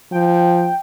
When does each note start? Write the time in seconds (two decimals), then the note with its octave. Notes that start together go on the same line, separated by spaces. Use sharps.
0.12 F3 G5